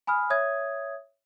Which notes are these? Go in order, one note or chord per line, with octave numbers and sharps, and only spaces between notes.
G#5 B5 D#6 F6
C#5 E5 D#6 G#6